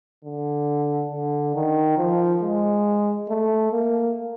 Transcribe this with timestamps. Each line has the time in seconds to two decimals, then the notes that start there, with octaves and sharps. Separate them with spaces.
0.25 D3
1.12 D3
1.55 D#3
1.98 F3
2.42 G#3
3.29 A3
3.72 A#3